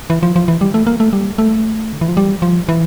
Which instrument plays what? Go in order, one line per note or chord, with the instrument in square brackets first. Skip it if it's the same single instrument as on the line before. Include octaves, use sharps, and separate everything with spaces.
[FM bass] E3
F3
F3
E3
G3
A3
A#3
A3
G3
A3
D3
E3
F3
G3
F3
E3